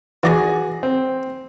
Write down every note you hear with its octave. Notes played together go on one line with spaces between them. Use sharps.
E3 F#4 G#4 D5 A#5
C4